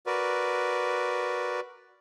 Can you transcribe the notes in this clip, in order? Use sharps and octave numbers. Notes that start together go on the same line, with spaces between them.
F#4 A#4 B4 D5